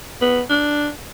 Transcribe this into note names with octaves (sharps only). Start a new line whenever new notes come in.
B3
D4